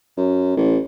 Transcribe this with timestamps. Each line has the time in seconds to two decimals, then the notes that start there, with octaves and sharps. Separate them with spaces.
0.17 F#2
0.57 A1